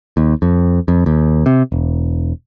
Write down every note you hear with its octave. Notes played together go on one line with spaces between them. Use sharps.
D#2
F2
F2
D#2
C3
E1